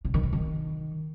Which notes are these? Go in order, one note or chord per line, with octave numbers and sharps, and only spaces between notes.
C3
D#3
C3
D#3